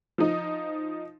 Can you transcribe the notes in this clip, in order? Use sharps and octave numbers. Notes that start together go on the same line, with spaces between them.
F3 D#4